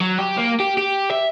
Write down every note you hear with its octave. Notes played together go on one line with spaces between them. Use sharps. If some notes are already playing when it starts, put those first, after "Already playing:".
F#3
G4
A#3
G4
G4
E5